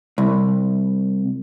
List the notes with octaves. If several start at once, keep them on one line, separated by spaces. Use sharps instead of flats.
C2